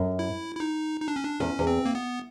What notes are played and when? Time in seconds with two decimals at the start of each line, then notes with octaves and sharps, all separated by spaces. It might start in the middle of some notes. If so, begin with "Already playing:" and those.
Already playing: F#2
0.19 E4
0.55 E4
0.60 D#4
1.00 D#4
1.08 D4
1.16 C#4
1.24 D4
1.40 E2 C#4
1.59 E2
1.67 C4
1.85 A#3
1.95 B3